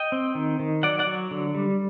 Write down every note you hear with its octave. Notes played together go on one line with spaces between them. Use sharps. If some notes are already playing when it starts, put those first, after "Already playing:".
Already playing: D#5 G5
C4
D#3
D#3
F#3 D5 F#5
D5 F#5
F#3
D3
G3